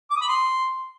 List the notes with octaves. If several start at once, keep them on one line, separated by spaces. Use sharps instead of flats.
D6
D#6
B5
C6